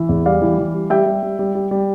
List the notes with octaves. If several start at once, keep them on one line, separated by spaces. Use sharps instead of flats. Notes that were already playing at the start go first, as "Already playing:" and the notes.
Already playing: E3 E5
E2
G3 D5 F5
E3
E3
G3
G3 E5 G5
G3
G3
G3
G3
G3